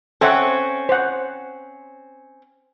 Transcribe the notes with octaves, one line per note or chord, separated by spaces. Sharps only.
C4 C#4 A4 E5 F#5
C5 F#5